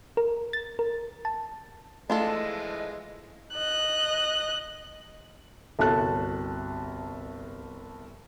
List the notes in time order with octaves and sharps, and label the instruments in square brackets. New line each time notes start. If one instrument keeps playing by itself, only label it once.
[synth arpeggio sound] A#4
A6
A#4
A5
[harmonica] E3 F3 G#3 [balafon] A3 [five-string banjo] D4 F4 A4 [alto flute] D#5
[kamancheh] D#5 F#6
[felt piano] G1 C2 F#4 A4 A5 F#6